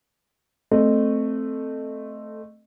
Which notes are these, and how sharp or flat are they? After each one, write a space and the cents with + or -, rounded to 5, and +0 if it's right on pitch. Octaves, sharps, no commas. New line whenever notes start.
A3 +0 C4 +0 D#5 -25